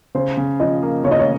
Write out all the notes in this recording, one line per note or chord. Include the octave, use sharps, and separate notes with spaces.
C#3 C5
C#3
F3 D#5
A#3
C#3 C#5
D#5
C#5